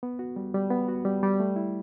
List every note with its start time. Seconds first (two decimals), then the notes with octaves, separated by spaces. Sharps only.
0.03 B3
0.19 F#4
0.36 G3
0.54 G3
0.70 B3
0.89 F#4
1.05 G3
1.23 G3
1.40 A3
1.56 E4